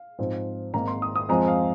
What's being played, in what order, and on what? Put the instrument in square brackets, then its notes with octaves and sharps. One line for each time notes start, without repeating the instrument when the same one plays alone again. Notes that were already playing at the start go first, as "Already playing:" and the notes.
Already playing: [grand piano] F5
G#2 F3 C4
G#1 G#2 D#3 A#3 A#5
C6
D#6
D#6
F2 F3 G#3 C4 A#5
F5